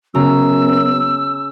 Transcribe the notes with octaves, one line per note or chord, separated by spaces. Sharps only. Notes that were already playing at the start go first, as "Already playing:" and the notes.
F#2 C#3 B3 A#5 E6